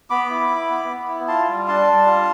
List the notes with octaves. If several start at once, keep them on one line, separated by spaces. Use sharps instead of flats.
B3 B5 D6
E4
E4
B3
B3
E4
F4 A5 C6
G3
D4 A5 C6
G3
F4